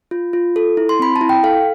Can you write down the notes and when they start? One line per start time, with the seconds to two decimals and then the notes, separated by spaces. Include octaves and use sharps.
0.11 F4
0.33 F4
0.56 A4
0.77 E4
0.89 C6
1.00 C4 B5
1.16 A5
1.21 E4
1.29 G5
1.43 A4 F5